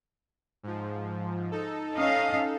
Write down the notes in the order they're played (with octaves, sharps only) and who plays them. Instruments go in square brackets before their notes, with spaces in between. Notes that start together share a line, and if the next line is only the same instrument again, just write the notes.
[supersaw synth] G#2 F3
D#4 A4
[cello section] C#4 D#5 F5